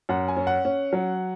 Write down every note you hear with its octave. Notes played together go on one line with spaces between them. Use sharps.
F#2 F#5
G#5
C#4
F#5
C#4
F#3